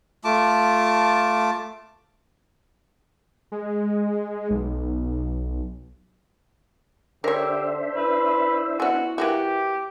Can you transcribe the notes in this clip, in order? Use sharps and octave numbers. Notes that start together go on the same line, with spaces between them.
A3 F4 A5 D6
G#3
B1
D3 D4 G4 A#4 C5 C#5 E5
E4 B4
B3 C#4 F#4
E3 A#3 F#4 G4